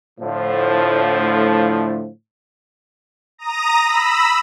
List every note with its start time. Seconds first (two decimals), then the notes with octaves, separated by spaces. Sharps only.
0.20 A2 D3 F3
3.38 A#5 D#6 A#6
3.83 B5 E6